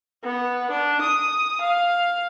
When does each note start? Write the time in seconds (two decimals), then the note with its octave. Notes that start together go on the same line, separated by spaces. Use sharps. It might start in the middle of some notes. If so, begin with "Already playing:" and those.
0.24 B3
0.70 D4
1.01 D#6
1.61 F5